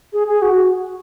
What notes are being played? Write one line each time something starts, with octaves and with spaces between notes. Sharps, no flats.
G#4
G#4
F#4